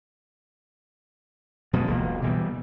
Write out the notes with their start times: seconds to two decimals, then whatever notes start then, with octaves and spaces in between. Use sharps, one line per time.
1.73 B2 F3 F#3 G#3
1.87 E1 C#2 A#3
2.22 B2 E3 G3